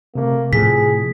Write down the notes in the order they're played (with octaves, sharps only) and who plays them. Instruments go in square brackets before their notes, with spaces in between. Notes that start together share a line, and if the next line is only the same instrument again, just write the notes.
[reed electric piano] C3 A3 [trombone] A#3
[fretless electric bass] A2 F3 [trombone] G#4 [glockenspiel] B6